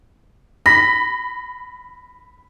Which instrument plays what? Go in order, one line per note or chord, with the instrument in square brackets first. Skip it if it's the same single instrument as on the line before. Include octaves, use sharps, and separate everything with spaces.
[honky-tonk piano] B5 B6 [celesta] A#6